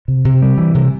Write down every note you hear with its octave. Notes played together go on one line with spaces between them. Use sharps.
C3
C3
G3
E3
C3